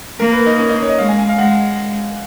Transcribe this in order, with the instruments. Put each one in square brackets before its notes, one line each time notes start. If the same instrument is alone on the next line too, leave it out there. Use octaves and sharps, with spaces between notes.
[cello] A#3 [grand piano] A#4
[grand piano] B4
D#4
C#4
D#4
C#5
D#5
[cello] G#3 [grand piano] F5
[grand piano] G#5
G#5
F5
[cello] G#3 [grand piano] F#5